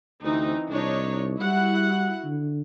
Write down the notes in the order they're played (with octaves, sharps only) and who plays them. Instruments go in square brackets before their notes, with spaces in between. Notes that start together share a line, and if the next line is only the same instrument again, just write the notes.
[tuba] D2 [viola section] E3 C4 D#4
[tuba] C2 [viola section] D4 D#4 C#5
[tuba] G3 [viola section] E4 F#4 F#5
[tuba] D3